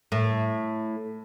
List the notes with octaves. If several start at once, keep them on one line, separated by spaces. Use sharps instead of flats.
A2